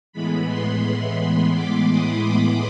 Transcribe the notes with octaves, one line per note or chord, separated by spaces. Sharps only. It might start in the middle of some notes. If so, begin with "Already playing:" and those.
A2 E3 G#3 B3 B5
C6
D6
D#6
D6